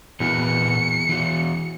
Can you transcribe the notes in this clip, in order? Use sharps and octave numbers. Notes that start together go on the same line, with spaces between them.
E2 A#2 F#4 B4 C#7
E3 F#4